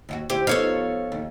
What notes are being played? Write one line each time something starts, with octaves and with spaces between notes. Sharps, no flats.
D#2 F4 F#4
D2 E4 G4 C5
F3 B3 D#4 A4 C#5 F5
D#2